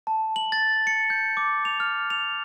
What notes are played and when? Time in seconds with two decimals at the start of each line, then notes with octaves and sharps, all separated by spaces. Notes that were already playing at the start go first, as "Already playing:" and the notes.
0.07 A5
0.36 F#7
0.52 A6
0.87 C#7
1.10 G6
1.37 D6
1.65 F7
1.80 F6
2.10 F7